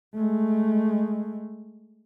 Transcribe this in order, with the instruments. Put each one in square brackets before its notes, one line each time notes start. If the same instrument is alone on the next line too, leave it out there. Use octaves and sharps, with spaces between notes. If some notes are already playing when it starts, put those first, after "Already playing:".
[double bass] G#3 A3